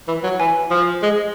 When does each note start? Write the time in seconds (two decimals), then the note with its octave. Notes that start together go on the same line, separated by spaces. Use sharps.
0.08 E3
0.24 F#3
0.40 E3 G#5
0.71 F3
1.03 G#3